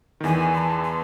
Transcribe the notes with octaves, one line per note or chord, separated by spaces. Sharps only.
D#3
E2 E3 G#5
C6
A5
C6